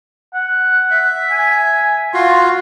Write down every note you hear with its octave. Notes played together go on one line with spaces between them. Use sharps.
F#5
E5
G#5
F4 F#4 C6